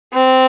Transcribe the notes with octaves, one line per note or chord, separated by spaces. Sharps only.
C4